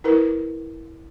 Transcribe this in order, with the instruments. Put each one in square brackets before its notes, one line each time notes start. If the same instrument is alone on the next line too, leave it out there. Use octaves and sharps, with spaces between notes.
[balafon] E4 A#4 B4